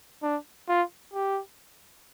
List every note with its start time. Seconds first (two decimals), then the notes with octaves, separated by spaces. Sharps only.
0.23 D4
0.69 F4
1.14 G4